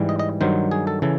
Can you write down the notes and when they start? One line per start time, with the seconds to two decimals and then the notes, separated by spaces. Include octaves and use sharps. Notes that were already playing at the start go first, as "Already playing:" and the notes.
Already playing: G#2 E3 G3
0.09 D#5
0.19 D#5
0.41 G2 D#3 F#3 C5
0.71 G#4
0.87 A4
1.02 C#3 E3 A4